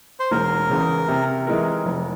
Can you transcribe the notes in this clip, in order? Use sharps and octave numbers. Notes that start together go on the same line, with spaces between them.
C5
E1 A#4
E2 C#3
C3
E3 G#3 E4 A#4
F1